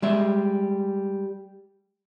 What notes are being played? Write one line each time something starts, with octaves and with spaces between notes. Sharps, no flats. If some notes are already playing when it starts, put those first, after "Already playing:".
G3 G#3 E5